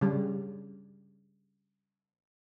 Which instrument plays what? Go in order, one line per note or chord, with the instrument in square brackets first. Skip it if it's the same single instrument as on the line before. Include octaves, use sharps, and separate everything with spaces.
[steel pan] C#3 G3